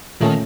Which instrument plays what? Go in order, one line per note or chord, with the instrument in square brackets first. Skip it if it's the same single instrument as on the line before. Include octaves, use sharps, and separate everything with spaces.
[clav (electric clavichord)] A#2 A3 C#4 A4 [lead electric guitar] D#3